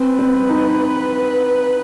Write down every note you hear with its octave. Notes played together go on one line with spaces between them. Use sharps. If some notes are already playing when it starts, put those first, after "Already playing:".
Already playing: C4 B4
C4
D#4